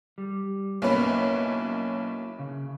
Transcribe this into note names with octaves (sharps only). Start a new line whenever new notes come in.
G3
B1 A#3 C#4 E4 B4
C#3